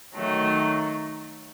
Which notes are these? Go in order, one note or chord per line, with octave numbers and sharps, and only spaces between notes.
D#3 F#3 A3